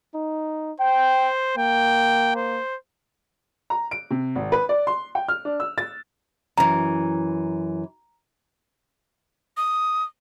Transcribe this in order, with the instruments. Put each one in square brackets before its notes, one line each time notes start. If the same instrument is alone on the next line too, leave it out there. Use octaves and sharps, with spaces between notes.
[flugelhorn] D#4
[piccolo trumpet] C5 [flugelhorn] G5
[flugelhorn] A#3 [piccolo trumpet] G5
[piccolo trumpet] C5
[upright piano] A#5
D7
C3
G#1
B4
D5
C6
G5
F6
D4
E6
A6
[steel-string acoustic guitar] F#2 E3 [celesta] A#5
[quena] D#6